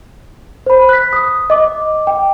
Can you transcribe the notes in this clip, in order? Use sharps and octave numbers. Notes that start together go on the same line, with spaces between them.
C5 B5
F#6 B6
D#6
D#5 D6
G5